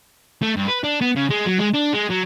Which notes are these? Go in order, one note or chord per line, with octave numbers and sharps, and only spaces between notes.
A3
G2
B4
D4
B3
C#3
G#3
F#3
G#3
D4
G#3
F#3